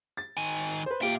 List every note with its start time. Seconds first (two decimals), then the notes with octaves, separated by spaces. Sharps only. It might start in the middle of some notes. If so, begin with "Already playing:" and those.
0.17 A6
0.37 D#3 G#5
0.86 B4 C5
1.01 A#2 F4 G4 E5 G5